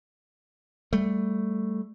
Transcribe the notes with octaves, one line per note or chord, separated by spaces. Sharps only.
G3 A3